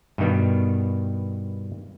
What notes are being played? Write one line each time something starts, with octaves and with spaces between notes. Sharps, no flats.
G2 B2 D#3 G3 B3